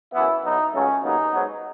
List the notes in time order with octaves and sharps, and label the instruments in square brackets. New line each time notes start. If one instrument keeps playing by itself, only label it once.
[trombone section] F#2 E3 B3 E4
B1 B2 F#3 B3 D#4
C#2 C#3 F#3 A3 C#4
D#2 C#3 F#3 B3 D#4
G#2 F#3 B3